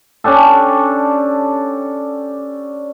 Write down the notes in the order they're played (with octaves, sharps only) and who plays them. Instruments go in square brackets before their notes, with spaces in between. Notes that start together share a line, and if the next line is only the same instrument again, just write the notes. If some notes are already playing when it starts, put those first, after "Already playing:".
[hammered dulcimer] C#4 D4 G4 A4